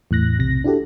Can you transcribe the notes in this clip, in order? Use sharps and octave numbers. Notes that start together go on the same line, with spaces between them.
E2 A2 F#6 A#6
B1 C3 A#6
D4 E4 F#4 G4 A4